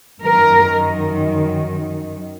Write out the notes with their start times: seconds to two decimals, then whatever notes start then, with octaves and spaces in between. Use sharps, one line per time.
0.21 F#2 D#3 A#4